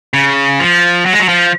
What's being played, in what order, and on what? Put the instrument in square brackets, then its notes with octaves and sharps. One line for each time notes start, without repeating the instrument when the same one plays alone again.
[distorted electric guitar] C#3
F3
F#3
G#3
F#3
F3